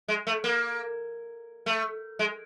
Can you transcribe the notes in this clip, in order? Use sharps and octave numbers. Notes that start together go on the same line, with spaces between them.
G#3
A3
A#3
A3
G#3